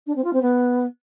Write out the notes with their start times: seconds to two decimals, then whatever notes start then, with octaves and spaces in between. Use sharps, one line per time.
0.06 D4
0.15 C4
0.24 F4
0.33 C4
0.42 B3